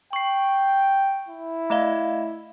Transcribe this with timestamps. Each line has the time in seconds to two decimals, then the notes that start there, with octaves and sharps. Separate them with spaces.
0.13 G5 C#6 C7
1.29 E4
1.70 A3 D#5 F5